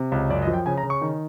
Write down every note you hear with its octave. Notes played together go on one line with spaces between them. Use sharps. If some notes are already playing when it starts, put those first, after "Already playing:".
Already playing: C3
C#2
F#2 D5
D#5
F3
G5
C#3 G#5
A#5
C#3
C#6
D#3